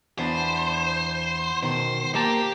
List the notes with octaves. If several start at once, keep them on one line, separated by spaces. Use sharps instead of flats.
E2 B3 D4 C5
B2 D#3 C5
A#3 G4 A#4 A5